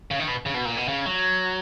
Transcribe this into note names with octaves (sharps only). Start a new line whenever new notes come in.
C#3
D#3
B2
C#3
B2
A#2
B2
C#3
F#3